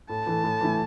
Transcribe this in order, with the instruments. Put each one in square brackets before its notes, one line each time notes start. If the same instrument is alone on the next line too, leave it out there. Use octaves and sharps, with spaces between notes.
[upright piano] A2 [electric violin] A5
[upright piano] E3 A3
A2
E3 A3 E4